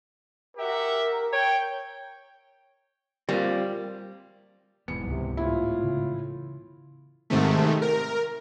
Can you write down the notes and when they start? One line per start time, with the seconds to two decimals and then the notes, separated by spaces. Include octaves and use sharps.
0.57 F#4 G4 A#4 E5
1.33 C#5 G5
3.29 G3 A#3 C4 F4
4.88 E1 G#2 E3 B3 C#7
5.03 C#2 C3 F#3
5.37 A2 E4 F4
5.84 C#3
7.30 G#2 C3 D#3 A3
7.82 A#4